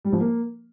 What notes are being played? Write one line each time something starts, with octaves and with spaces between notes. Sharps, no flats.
G3
F3
A#3